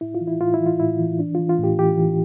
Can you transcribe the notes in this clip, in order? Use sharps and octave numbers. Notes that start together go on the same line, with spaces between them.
A2 E4
F4
E3
E4
A2 F4
E4
E3
F4
A2 E4
E3
E3 D4
E3 F4
F4
A2 G4
E3 G4
E3